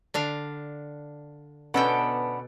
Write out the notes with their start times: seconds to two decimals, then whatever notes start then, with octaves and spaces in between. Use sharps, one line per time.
0.14 D3 D4 F5
1.74 B2 B3 C#4 D4 A4 G5